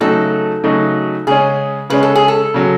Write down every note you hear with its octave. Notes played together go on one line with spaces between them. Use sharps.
C#3 F#3 A3 D#4 F#4 A4
C#3 F#3 A3 D#4 F#4
C#3 G#3 C#4 G#4
C#3 G#3 C#4 B4
A4
G#4
A4
C#3 F#3